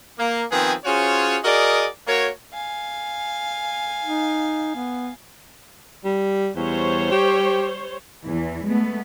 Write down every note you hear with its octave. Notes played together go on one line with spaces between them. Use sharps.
A#3
D#3 F3 B3 C4 G#4
C#4 F4 F#4 G#4 C5 C#5
F#4 G#4 A#4 D5 D#5
A#3 F#4 A#4 C#5
F5 G#5
D#4
B3
G3
E2 G3 C5 C#5
G4
E2 E3
G#3 A3 B3